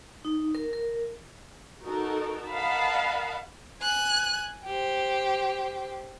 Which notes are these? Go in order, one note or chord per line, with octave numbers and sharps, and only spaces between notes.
D#4
A#4
A#4
D#4 F#4 A4 A#4
A#4 D#5 F5 F#5 A5 B5
G#5 F#6
G4 C5